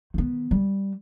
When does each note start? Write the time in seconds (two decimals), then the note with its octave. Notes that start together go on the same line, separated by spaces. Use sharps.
0.14 D#3 B3
0.51 G3